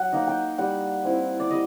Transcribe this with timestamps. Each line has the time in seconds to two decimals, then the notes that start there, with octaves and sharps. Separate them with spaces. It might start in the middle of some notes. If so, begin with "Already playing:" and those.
Already playing: F#3 F#5
0.13 A#3 D#4
0.27 G5
0.58 G3 F#5
1.05 C4 E4
1.40 D5
1.51 G3 D#5